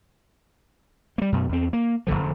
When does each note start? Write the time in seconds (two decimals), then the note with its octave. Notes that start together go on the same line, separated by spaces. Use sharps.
1.18 G3 A#3
1.32 F#2 B2
1.49 E2 C4
1.73 A#3
2.07 F1 C2 D3 F3